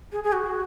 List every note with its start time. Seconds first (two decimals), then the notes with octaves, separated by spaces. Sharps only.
0.12 G#4
0.23 G#4
0.32 F#4